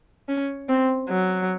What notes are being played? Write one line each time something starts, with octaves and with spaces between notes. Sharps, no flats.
C#4
C4
F#3